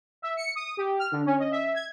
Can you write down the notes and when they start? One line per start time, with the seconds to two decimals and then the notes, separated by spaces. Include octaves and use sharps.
0.22 E5
0.37 C#7
0.55 D#6
0.77 G4
0.99 F6
1.11 D3
1.26 C#4
1.39 D#5
1.51 E5
1.74 G#6